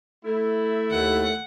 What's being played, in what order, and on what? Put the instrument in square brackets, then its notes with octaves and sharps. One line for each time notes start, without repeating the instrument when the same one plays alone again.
[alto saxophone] A3 [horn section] E4
[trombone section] D#2 D#3 [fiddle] F#5